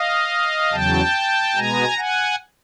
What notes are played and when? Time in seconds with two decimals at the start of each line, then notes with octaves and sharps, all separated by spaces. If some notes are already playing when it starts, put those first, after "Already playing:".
Already playing: D#5 F5
0.71 E2 C#3 F#3 G5 A5
1.56 B2 G#3 B3 G#5 A#5
1.98 F#5 G#5